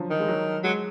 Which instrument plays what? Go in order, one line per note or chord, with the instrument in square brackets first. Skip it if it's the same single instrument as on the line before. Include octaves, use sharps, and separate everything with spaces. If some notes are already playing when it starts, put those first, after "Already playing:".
Already playing: [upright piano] D3 F3 F#3
[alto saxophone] D#3
[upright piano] G#3
F#3
[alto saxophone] F#3 [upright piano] G#3